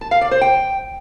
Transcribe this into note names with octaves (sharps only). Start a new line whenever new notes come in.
A5
F5
D5
C5
G5